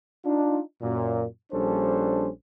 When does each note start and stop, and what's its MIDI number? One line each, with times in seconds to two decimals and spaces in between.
0.25 0.59 62
0.25 0.59 63
0.25 0.59 65
0.82 1.24 42
0.82 1.24 46
1.52 2.28 34
1.52 2.28 55
1.52 2.28 61
1.52 2.28 62
1.52 2.28 69
1.52 2.28 72